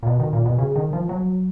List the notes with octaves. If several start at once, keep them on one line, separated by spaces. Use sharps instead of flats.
A#2
B2
D#3
A#2
B2
C#3
D#3
F3
F#3